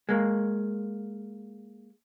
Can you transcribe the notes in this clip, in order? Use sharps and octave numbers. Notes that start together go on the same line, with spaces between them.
G#3 A#3